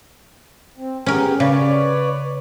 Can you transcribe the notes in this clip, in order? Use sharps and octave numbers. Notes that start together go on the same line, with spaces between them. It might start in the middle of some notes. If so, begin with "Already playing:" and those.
C4
B3 C#4 G4 G#4 A#4
C#3 B4 C#5 D5